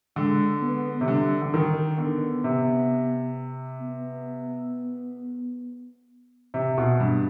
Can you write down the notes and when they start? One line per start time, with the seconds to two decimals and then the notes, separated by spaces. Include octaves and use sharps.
0.16 D3 G#3
0.61 B3
1.01 C3
1.07 D3 G3
1.42 D3
1.54 D#3
1.98 D3 B3
2.44 C3
3.80 B3
6.54 C3 C4
6.78 B2
6.84 B3
7.00 G2